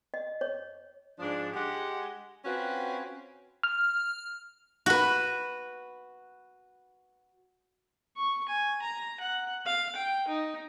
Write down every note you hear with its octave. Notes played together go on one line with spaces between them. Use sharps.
D#5
C#5
G#2 F3 D4
G#3 G4 F#5
C4 C#4 F4 F#4 B4
F6
F#4 B4
C#6
G#5
A#5
F#5
F5
G5
D#4